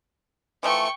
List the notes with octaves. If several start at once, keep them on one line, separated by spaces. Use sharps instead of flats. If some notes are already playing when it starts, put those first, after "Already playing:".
E3 F3 A3 G5 C#6